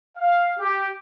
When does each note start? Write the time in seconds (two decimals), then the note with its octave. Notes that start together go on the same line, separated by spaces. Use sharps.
0.17 F5
0.58 G4